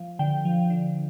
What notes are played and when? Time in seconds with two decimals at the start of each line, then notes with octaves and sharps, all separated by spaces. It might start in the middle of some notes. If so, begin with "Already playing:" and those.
Already playing: F3
0.19 D3 G5
0.45 F3
0.70 D3